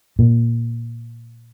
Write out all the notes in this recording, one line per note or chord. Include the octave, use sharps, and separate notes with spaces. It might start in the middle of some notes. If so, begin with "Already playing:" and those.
A#2